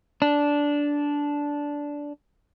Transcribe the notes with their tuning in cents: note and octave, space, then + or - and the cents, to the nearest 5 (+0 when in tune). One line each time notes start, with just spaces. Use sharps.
D4 -10